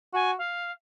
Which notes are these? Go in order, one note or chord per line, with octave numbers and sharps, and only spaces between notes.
F#4 G#5
F5